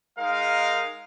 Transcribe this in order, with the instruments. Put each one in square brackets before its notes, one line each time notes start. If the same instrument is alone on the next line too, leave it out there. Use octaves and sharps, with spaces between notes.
[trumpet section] G#3 D#4 A#4 F5